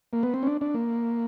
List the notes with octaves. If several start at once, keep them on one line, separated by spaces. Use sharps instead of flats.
A#3
B3
C4
C#4
D4
D4
A#3